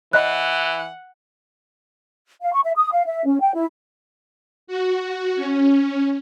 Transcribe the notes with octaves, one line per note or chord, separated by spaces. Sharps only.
E3 C#5 D#5 F#5 B5 F#6
F5
C#6
E5
D#6
F5
E5
C#4
G5
E4
F#4
C#4